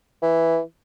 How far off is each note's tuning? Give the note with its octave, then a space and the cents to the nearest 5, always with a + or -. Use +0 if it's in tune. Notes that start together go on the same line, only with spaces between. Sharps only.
E3 +0